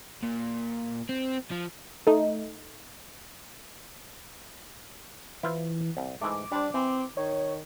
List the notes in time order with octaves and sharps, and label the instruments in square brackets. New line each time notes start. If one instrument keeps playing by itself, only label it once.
[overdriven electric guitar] A#2
C4
F3
[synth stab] A3 D#4
[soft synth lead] E3 [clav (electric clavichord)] E4 F4 C5
[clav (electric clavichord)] C2
[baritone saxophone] G#2 [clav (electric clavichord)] E3 G#3 A3 [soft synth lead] D6
[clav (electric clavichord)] G3 C5 [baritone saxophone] D4
[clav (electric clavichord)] E3 [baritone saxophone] C4
[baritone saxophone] D#3 [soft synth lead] C#5